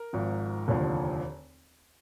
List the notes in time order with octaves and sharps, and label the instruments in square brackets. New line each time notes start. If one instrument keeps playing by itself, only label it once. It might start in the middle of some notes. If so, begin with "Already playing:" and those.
Already playing: [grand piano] A#4
G#1 G#2 F3
F1 D#2 D3 F3